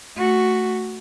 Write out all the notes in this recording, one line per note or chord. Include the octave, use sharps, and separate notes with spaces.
A3 F#4